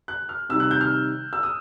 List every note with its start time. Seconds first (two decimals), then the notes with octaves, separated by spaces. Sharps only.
0.08 F#6
0.29 F6
0.49 C3 D#3 G3 E6
0.60 F#6
0.71 G6
0.81 F6
1.33 E6
1.43 D#6